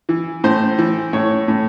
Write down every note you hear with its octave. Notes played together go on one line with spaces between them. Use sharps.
E3
A2 C5
E3
A2 C#5
A2